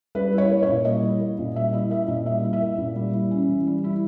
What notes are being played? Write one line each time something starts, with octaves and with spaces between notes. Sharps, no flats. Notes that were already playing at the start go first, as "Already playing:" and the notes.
G3 B4
E4
C#5
A#3
C#5
A#2
G3 D#5
E4
A#3
A#2
G3 E5
E4 D#5
A#3 E5
A#2 D#5
G3 E5
E4
E5
A#3
A#2
G3
E4
C#4
E3
G3
E4